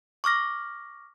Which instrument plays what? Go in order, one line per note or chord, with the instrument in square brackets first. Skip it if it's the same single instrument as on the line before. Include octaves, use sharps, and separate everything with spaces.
[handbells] C#6 D6 F6 A#6